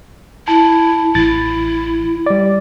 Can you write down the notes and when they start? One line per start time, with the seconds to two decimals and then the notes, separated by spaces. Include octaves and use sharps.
0.48 E4 A5
1.15 A1 E4 A6
2.26 G3 D5